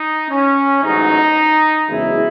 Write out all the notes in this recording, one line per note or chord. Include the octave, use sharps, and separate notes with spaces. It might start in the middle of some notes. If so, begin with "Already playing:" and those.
Already playing: D#4
C#4
A1 G#2 F#3 D#4
F#1 E2 C#3 G#3 E4